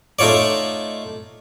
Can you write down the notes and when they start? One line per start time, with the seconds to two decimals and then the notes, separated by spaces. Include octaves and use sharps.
0.19 A3 D#4 F4 C#5 D5